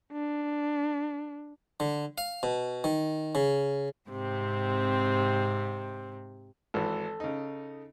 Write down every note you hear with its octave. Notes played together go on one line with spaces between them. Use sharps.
D4
D3
F5
B2
D#3
C#3
G#2 C3 C4
G#1 E3 A4
C#3 D#4